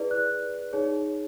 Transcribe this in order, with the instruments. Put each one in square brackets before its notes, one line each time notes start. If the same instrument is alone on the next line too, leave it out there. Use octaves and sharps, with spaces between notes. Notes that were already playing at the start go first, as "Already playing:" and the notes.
Already playing: [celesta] E4 G#4 B4 D5
F#6
D#4 G#4 C#5